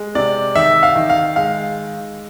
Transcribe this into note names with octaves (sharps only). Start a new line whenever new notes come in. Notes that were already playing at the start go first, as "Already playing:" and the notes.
Already playing: G#3
C3 D5
D#3 E5
F5
D#3
F5
G#3 F5